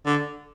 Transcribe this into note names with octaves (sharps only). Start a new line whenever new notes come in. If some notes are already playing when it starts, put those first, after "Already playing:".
D3